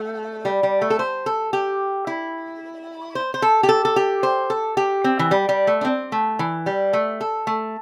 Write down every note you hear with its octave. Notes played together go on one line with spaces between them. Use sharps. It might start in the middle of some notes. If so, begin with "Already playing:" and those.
Already playing: A3
G3
G3
A3
A4
C5
A4
G4
E4
C5
C5
A4
G4
A4
A4
G4
C5
A4
G4
C4
E3
G3
G3
A3
D4
C4
A3
E3
G3
A3
A4
A3